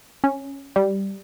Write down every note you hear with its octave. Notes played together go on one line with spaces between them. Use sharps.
C#4
G3